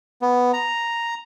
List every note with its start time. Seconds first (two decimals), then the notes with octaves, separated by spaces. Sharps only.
0.22 B3
0.53 A#5